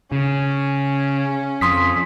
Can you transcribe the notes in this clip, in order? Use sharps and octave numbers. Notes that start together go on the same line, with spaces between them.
C#3 C#4
F2 C6 D#6 B6